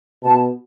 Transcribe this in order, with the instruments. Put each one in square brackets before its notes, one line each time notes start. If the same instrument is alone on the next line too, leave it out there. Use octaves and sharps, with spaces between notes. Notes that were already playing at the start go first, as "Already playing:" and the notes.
[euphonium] B2 [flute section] A5